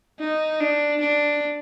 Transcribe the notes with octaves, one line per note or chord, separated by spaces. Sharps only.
D#4
D4
D4